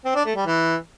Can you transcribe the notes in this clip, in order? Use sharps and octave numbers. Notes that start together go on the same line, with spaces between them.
C4
D4
A3
G3
E3